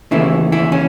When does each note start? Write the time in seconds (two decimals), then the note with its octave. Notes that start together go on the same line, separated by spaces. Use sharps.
0.11 D#2 C#3 E3 A3 E4
0.52 E4
0.72 C#4